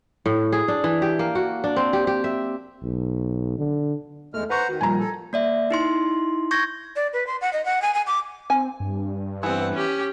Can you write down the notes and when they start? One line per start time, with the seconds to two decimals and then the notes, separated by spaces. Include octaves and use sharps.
0.26 A2
0.52 G#4
0.68 D4
0.84 E3
1.02 G4
1.19 A#3
1.35 F#4
1.64 D4
1.76 C4
1.93 G4
2.07 G4
2.24 E5
2.82 B1
3.59 D3
4.34 E2 G#3 A3 F6
4.50 B4 C5 F#5 A#5 C#6
4.69 D#3 F#4
4.81 A#2 F3 G3 G#5 A#5
4.99 A4
5.33 A#3 D5 E5
5.71 D#4 E4 C6
6.51 C#6 G6 G#6 A#6
6.96 D5
7.13 B4
7.27 C6
7.41 F#5
7.53 D#5
7.65 F#5
7.82 G#5
7.94 G#5
8.07 D6
8.50 C4 G#5
8.80 G2
9.43 E3 B3 C4 F#5
9.74 C#4 G4